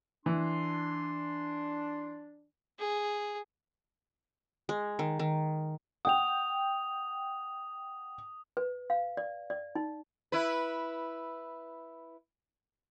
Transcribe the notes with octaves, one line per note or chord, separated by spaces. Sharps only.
E3 D4 C6
G#4
G#3
D#3
D#3
F#5 G5 D#6 F7
B4
F5
D5
D5
D#4
E4 B4